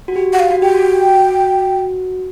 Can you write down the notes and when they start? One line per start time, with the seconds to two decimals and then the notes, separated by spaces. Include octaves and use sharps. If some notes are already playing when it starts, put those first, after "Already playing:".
0.08 F#4
0.16 G4
0.33 F#5
0.39 F5
0.51 F#4
0.62 G4 G5
0.74 F#4